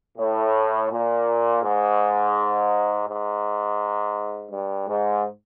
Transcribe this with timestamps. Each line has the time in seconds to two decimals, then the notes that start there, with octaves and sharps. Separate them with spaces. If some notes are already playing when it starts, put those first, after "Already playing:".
0.18 A2
0.90 A#2
1.62 G#2
3.07 G#2
4.49 G2
4.87 G#2